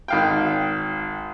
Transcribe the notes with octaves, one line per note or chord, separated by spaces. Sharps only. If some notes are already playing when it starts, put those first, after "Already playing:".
G#1 F5 G5